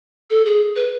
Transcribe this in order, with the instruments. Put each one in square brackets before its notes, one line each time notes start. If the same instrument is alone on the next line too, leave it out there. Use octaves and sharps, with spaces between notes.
[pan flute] A4
G#4
B4